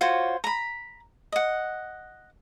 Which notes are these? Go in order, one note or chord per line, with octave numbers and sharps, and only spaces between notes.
F4 F#4 C5 C#5
A#5 B5
D#5 F#5